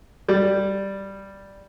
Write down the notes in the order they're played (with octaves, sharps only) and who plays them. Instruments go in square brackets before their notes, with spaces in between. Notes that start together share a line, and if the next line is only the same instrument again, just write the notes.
[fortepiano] G3